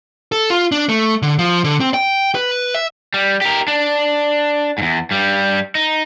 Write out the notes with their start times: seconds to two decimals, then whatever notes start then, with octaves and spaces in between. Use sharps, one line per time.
0.32 A4
0.50 F4
0.72 D4
0.89 A3
1.22 D3
1.39 F3
1.64 D3
1.80 C4
1.94 G5
2.35 B4
2.74 E5
3.14 G3
3.41 G4 A#4
3.68 D4
4.78 E2 G#2
5.11 G2 G3
5.75 D#4